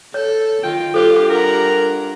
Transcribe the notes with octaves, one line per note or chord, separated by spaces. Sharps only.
A4 C#5
D#3 F4 G5
G2 D4 F4 G4 A4 C5
A#4 F#5 A#5